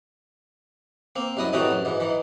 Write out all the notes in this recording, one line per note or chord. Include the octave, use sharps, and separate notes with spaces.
A#3 C4
C2 F#2 E4 D#5 D#6
A2 C3 E3 D#4 F#4 G5
F#2
G#2 E3
D#3 E3